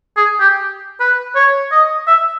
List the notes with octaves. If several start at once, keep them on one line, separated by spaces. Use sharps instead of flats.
G#4
G4
B4
C#5
D#5
E5